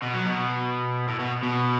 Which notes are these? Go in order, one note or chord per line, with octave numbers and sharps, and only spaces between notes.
B2
F#3
B2
A2
B2
B2